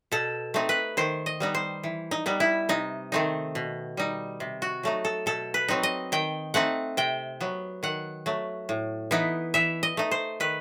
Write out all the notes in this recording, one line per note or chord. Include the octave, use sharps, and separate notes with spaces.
B2 A4
A3 C4 D#4
B4
D#3 C5
D#5
G3 B3 D#4
C5
E3
D#4
G3 B3 D#4
E4
C3 D#4
D#3 A3 C4 D#4
B2
G3 D#4
C3
F#4
F#3 A3 D#4
A4
B2 A4
B4
F#3 C4 D#4
D#5
D#3 G5
A3 C4 D#4 F#5
C3 G5
F#3 B3
D#3 F#5
F#3 A3
A2
E3 B3 D#4
E3 E5
D#5
A3 D#4
C5
D#3 B4